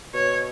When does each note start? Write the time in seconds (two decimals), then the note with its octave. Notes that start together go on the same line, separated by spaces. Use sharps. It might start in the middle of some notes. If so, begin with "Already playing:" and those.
0.14 B2 C#5